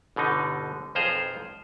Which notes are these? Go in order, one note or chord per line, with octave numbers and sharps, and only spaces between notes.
G1 B2 D3 D#4
B1 F2 F3 G#4 C5 A#5